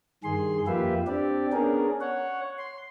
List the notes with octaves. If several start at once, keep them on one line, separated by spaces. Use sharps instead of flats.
G2 D#3 G#4 C6
F2 A#3 F4 G4 B4 E5
C4 D4 G4 D5
B3 C#4 D4 G#4 A#4
C#5 F#5
C6